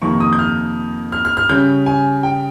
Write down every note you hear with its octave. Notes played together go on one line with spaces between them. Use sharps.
F2 C3 D#3 A#3 C#6
D#6
G6
F6
F6
F6
F6
C#3 G3 C#4 G6
G#5
G5